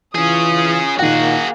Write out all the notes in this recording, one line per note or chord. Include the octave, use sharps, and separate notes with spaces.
E3 C#4 F4 G#4 D#6
A#2 D#3 A#3 F#4 G#4 F#5